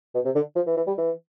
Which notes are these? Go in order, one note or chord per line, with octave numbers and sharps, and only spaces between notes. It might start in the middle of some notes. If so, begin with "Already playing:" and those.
B2
C3
D3
F3
E3
E3
G3
E3